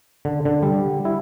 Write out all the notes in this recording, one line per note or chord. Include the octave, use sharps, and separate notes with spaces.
D3
D3
G3
E4